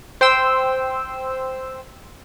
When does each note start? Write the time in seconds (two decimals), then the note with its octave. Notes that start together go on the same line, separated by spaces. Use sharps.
0.21 C5 G5 C6 E6